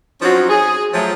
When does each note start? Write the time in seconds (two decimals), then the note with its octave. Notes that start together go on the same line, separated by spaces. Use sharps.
0.22 F3 F#3 C4 C#4 D#4 F#4
0.49 G#4
0.93 F3 F#3 A3